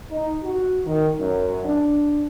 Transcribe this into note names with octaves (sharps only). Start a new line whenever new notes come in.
D#4
F#4
D#3
F#2
D4